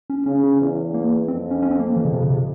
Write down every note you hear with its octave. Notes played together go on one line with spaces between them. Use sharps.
C#4
C#3 C#4
C#4
E2
A#3
F2 C4
C#4
C#4
C4
A#3
E3
C#3
C3
C#3
C3